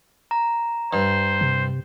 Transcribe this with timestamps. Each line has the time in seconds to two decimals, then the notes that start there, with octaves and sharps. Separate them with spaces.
0.31 A#5
0.93 G2 C5
1.41 C3